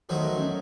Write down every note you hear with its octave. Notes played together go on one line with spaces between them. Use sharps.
D#3 F#3 A3 A4 C5
F#4 A#4
C#4